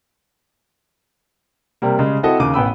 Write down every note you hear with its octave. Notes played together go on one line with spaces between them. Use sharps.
C3 G3 A#3
C#3 G3 G#3
C4 E4 F#4 A4 D#5
D#2 C#3 D6 D#7
A1 B3 G5 B5 E6